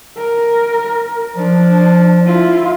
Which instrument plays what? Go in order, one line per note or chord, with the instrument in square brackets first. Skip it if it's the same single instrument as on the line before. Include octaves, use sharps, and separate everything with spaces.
[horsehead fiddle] A#4
[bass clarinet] F3 [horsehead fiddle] D4
[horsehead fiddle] E4 F4